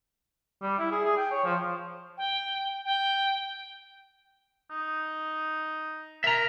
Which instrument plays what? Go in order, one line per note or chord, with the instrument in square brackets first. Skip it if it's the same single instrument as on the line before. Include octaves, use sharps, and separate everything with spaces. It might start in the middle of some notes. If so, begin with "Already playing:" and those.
[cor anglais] G3
E4
G#4
G#4
G5
C#5
F3
[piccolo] G5
G5
[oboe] D#4
[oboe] A#4 [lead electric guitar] E5 A#5